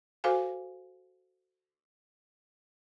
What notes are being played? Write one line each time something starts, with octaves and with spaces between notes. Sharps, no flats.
F#4 A4 C5 F5 G#5